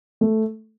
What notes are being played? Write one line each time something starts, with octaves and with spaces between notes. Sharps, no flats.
A3